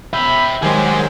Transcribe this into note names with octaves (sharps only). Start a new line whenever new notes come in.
E5 G5 B5
D#3 F#3 G#3 G4 G#4 C5